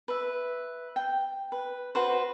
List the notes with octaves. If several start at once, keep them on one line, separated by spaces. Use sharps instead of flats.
B4 E5
G5
B4
F#4 B4 C5